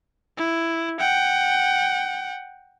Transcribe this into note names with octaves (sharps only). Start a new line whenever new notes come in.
E4
F#5 G5